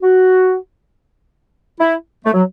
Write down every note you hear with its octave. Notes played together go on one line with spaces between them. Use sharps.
F#4
E4
A3
F#3